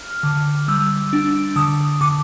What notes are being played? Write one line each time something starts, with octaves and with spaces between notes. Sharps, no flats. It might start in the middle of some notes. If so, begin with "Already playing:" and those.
Already playing: F6
D3
G3 E6
D4
D3 D#6
D3 D6